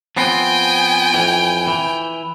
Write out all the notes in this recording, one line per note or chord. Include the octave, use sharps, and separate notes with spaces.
F3 B3 C4 G5 G#5
F2 E3
E3